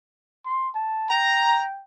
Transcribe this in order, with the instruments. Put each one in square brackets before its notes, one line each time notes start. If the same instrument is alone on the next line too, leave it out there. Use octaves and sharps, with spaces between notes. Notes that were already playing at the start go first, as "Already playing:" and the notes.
[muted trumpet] C6
A5
[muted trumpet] G5 [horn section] A#5